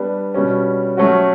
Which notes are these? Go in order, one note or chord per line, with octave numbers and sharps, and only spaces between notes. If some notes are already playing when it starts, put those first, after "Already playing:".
Already playing: G3 B3 D4
B2 G3 C#4
F#3 A3 C#4 F#4